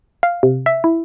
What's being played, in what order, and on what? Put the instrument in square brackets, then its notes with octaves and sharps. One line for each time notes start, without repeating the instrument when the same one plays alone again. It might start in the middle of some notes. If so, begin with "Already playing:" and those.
[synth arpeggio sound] F5
C3
E5
E4